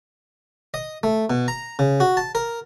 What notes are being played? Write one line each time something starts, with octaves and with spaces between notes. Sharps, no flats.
D#5
A3
B2
A#5
C#3
F#4
A5
A#4